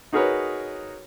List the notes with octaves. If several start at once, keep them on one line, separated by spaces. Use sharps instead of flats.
D#4 F#4 G#4 A#4 B4 C#5